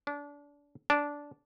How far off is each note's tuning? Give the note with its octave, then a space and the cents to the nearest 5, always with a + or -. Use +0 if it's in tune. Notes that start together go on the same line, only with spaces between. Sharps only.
D4 -25
D4 -10